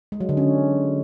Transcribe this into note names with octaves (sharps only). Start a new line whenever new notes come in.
G#3
F#3
D3
C#4